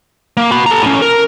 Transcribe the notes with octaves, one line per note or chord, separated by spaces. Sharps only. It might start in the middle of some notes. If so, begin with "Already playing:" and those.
A#3
F#4 B5
A4 A#5
A2 C#4
A#4